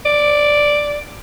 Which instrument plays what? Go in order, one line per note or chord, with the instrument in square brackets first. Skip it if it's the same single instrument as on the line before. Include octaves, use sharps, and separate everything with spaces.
[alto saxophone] D5